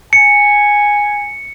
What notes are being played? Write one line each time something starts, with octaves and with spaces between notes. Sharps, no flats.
G#5 C#7